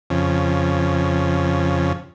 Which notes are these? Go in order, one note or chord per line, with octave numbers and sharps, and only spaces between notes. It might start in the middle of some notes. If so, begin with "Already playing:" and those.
F2 C#3